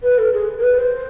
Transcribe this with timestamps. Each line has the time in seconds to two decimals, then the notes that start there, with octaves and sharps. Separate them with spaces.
0.02 B4
0.18 A4
0.33 G#4
0.58 A#4
0.63 B4
0.78 C5